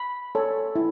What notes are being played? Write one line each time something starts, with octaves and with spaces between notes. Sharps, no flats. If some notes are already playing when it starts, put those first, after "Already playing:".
Already playing: B5
A4 C#5
E4